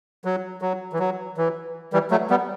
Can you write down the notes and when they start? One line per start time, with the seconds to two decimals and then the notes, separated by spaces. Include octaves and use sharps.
0.25 F#3
0.62 F#3
0.92 E3
0.99 F#3
1.37 E3
1.93 E3 G3
2.11 F#3 A3
2.30 G3 B3